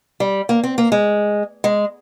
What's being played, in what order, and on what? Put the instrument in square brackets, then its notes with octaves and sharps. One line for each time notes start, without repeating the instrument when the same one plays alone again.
[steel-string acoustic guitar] G3
A#3
C4
A#3
G#3
G#3